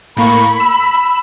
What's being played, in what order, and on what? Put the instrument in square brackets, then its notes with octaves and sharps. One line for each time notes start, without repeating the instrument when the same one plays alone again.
[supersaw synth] A2 A#3 C#6 [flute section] B5
[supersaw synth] E6